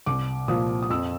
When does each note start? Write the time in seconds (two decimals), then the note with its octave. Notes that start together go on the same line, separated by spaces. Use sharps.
0.06 C2 D6
0.48 A#2 F3 D#6
0.83 D#6
0.90 F2 E6